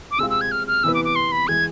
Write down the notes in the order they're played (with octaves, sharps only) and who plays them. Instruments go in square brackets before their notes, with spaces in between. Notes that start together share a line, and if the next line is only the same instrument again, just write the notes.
[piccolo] D6
[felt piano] C3 G#3 C4 F4 [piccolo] E6
[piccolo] E6
G#6
F6
F6
[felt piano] C3 E3 B3 E4 B4 [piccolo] E6
[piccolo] D6
D6
C6
B5
[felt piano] E3 G#3 [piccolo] G#6